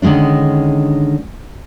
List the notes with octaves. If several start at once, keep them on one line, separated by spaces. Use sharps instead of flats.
D3 D#3 G#3 C#4 D4